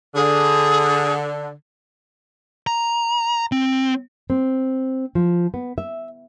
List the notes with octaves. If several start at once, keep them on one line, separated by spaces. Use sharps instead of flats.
D3 G#4
A#5
C4
C4
F3
B3
E5